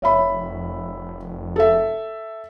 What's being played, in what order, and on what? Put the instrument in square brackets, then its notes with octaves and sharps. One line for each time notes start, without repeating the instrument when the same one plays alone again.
[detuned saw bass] F1 [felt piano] C#5 E5 B5
[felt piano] A4 E5